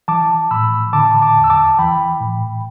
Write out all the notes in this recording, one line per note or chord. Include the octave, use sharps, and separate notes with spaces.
E3 A5 D6
A2 B5 E6
D3 A5 D6
A5 D6
E2
E6
A5 D6
E3 G5 B5
A2